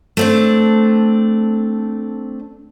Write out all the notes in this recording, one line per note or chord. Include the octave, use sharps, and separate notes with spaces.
A3 C4 D4